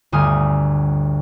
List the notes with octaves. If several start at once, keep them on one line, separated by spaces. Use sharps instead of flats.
G1 D2 G#5 D#6 F6